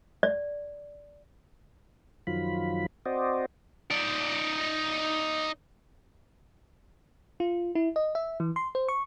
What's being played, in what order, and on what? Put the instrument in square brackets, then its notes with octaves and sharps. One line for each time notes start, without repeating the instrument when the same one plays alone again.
[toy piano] D5
[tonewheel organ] F#2 D#3 F3 F#3 F4 B5
C4 F#4 C5 D5 D#5
[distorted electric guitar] D#4 D5
[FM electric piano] F4
E4
D#5
E5
E3
C6
C5
C#6